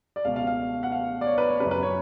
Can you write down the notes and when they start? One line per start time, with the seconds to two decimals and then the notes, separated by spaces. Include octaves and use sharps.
0.16 D5
0.25 C#2 B2 F5
0.36 F5
0.47 F5
0.83 F#5
0.92 F5
1.21 D5
1.26 C#5
1.38 B4
1.49 C#5
1.60 C#3 B4
1.65 F#2
1.71 B4
1.83 C#5